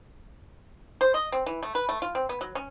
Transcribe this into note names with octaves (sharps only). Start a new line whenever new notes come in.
C5
D#5
C4
E3
A3
B4
A3
F4
C4
B3
F#3
C#4